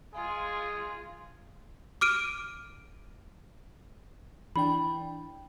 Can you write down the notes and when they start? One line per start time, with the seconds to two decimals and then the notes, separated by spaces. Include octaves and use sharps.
0.13 G#3 F4 G#4
2.01 D6 F6 D7 D#7
4.56 E3 D4 G5 B5